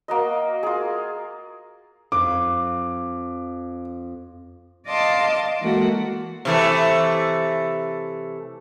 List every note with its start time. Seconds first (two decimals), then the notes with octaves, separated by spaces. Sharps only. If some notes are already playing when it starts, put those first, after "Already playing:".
0.08 A#3 F#4 D#5
0.63 F4 G#4
2.12 F2 D6
4.88 D5 D#5 F5 A5 C6 D6
5.61 E3 G#3 A#3 F#4 A4
6.45 C3 E3 A3